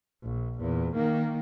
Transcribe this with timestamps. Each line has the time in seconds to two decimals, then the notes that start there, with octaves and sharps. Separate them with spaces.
0.24 A#1
0.60 E2 A#2
0.95 D#3 A#3